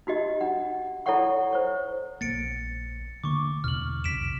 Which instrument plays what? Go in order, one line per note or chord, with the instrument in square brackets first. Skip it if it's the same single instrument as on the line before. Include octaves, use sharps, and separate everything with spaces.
[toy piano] D#4 F#4 G4 D#5
D4 F#5
E4 A4 C#5 D5 F#5 C#6
C5 C#5 C#6
[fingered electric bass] A#1 A#3 [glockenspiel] A6 C#7 D7
[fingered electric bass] D3 A3 A#3 [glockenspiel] C#6 D6
[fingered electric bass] E2 B2 [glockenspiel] F6 F#7
[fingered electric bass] B1 F2 C3 [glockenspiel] B6 D7 E7